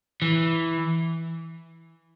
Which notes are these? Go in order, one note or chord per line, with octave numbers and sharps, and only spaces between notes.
E3